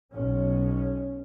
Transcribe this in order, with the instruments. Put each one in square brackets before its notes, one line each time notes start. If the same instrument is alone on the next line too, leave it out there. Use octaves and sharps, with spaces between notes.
[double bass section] B1 C#4